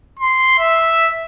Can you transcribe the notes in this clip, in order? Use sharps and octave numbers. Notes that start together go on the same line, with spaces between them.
C6
E5